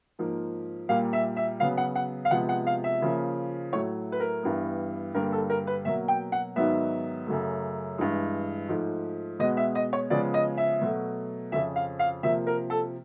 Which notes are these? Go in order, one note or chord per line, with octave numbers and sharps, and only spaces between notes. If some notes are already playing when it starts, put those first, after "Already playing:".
G#2 F3 A#3
A#2 G3 A#3 F5
E5
E5
C#3 F#3 B3 F5
F#5
F#5
F5
C3 F3 G#3 B3 F#5
F#5
F5
E5
C#3 F3 A#3
A2 F#3 A3 C#5
B4
A#4
G2 E3 G3 B3
G2 D3 G3 A#3 A#4
A4
A#4
B4
B2 F#3 A#3 E5
G5
F#5
G#2 D#3 F#3 B3 E5
F#2 C#3 F#3 A3
G2 E3 G#3
G#2 F3 A3
B2 G#3 B3 D#5
E5
D#5
C#5
C#3 F3 G#3 B3 D5
D#5
E5
B2 F#3 A3
F2 C#3 F3 E5
F5
F5
C3 F3 A#3 E5
A#4
A4